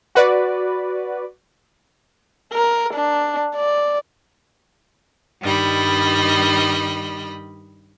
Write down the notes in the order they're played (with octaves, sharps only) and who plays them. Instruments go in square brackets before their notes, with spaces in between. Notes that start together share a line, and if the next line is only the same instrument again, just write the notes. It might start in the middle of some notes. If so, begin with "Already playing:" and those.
[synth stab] F#4 B4 D5
[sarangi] A#4
D4
D5
[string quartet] G2 D#3 G3 D#5 B5